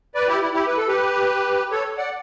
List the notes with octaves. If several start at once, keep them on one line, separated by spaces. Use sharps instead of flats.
B4 D5
E4 G4
E4
E4 G4
B4
A4
G4 B4
A4 C#5
D5 F#5